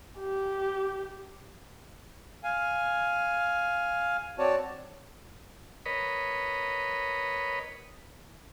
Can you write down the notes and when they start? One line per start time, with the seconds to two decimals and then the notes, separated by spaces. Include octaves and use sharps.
0.19 G4
2.44 F5 G#5
4.39 C4 F#4 C#5 D5 A5
5.86 A#4 B4 C#5 D#5 B5